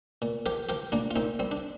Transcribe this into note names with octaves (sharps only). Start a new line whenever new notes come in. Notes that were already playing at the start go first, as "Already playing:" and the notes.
A#2
F3 G4 A#4
F3 G4 A#4
A#2 A#3 D4
F4
A#2 C4 D#4
G3 C4
D4